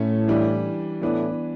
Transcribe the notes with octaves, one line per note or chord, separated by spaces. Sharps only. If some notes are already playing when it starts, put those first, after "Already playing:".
Already playing: A2 A3 C#4 E4
E3 G3 D4
A2 E3 B3 D4